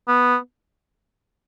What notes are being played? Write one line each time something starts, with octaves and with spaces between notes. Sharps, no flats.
B3